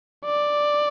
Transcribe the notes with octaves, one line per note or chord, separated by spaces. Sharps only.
D5